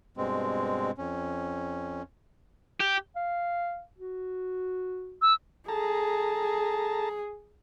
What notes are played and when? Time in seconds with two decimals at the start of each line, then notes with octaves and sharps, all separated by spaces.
0.17 G2 B2 G#3 C4
0.98 F2 C#4
2.80 G4
3.16 F5
3.98 F#4
5.22 E6
5.68 G#4 A4 A5 A#5